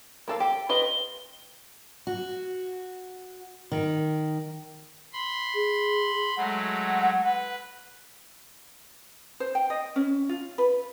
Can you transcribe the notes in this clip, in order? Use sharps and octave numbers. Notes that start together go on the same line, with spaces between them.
A#3 A4 F5
G4
F4 B4 D#5 G7
F#4
D#3
B5 C6
G#4
F#3 G#3 A3 F#5
B4
C5
G5
D#5
C#4
F4
B4